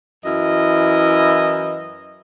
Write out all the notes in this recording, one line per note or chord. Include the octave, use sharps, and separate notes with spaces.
F#2 E3 E4 D#5